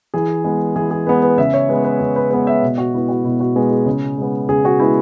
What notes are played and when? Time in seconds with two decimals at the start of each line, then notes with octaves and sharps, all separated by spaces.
0.14 E3 G#4
0.44 G#3 B3
0.76 E3 G#4
0.91 G#4
1.07 G#3 B3 B4
1.22 B4
1.38 C#3 E5
1.54 C#5
1.69 G#3 B3 B4
1.84 B4
2.00 C#3 G#4
2.16 B4
2.31 G#3 B3 B4
2.47 E5
2.63 B2
2.78 F#4
2.93 G#3 B3 E4
3.09 F#4
3.24 B2 E4
3.40 F#4
3.55 G#3 B3 B4
3.71 G#4
3.86 C#3
4.18 G#3 B3
4.49 C#3 G#4
4.65 F#4
4.80 G#3 B3 E4